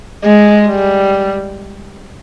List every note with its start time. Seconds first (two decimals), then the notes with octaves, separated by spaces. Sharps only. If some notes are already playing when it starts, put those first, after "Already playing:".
0.24 G#3
0.69 G3